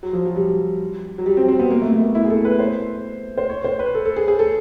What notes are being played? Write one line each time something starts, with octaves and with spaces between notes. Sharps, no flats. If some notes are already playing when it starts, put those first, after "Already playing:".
F#3
F3
F#3
G3
F#3
G3
C4
C4
B3
A#3
A3
A3
B3
A#3
E4
G#4
A4
B4
C5
C5
C#5
C5
B4
A4
A4
G#4
G#4
A4